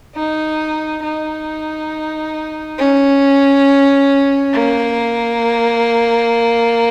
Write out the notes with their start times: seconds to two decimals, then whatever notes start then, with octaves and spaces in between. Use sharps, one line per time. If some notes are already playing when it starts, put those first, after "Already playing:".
0.15 D#4
1.03 D#4
2.78 C#4
4.53 A#3